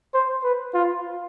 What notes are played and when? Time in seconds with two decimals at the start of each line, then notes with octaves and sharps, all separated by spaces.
0.14 C5
0.44 B4
0.74 F4